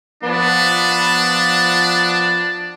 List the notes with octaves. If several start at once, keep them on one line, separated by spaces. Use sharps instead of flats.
F3 B3 D4